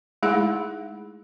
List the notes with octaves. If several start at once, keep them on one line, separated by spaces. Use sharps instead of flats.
G#3 A3 D#4 E4 G#4 F#5